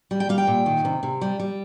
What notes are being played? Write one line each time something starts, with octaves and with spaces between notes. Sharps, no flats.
G3
G5
G3 F5
G5
A#2
D#3
C3
C3
G3
G3